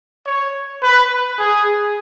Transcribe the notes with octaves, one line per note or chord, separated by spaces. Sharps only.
C#5
B4
G#4